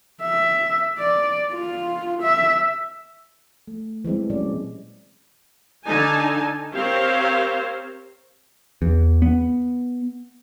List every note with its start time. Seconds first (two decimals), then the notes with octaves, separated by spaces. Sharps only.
0.22 E5
0.98 D5
1.53 F4
2.22 E5
3.68 A3
4.04 E3 G3 G#3 C4
4.30 A#2 F#3 C#4 D5
5.86 D3 D#4 G#5 A5
6.74 C4 G4 A#4 C5 C#5 F5
8.82 E2
9.22 B3